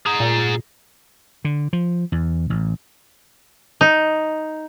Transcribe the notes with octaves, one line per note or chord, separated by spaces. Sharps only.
G#4 A#5
A#2
D3
F3
E2
A1
D#4